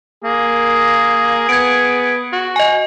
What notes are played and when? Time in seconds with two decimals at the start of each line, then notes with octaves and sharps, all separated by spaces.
0.24 A#3 G#4
1.49 B3 G#6 D7
2.33 F#4
2.56 D#5 G#5